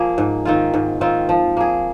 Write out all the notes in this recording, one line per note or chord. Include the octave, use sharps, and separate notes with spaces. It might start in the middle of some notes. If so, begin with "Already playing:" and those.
Already playing: F3 A#3 G#4
G#2
D#3 C4 F4
G#2
D#3 C4 F4
F3
A#3 G#4